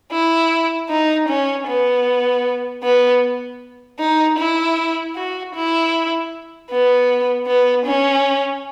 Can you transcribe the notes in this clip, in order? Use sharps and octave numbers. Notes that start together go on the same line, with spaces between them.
E4
D#4
C#4
B3
B3
D#4
E4
F#4
E4
B3
B3
C#4